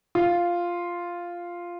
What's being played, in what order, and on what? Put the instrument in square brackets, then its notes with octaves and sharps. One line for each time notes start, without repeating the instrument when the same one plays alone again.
[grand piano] F4